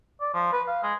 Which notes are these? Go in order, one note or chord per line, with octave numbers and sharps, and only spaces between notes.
D5
F3
B4
F5
G#3